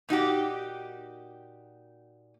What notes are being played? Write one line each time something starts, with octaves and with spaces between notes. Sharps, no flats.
A#2 D#4 F#4 G4